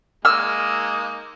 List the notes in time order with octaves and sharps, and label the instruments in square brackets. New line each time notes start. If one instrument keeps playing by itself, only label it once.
[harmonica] G#3 A#3 D#4 [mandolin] E6 F6